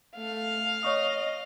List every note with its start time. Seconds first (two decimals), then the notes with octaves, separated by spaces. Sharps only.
0.17 A3 F5
0.83 C#5 D#5 C#6 D#6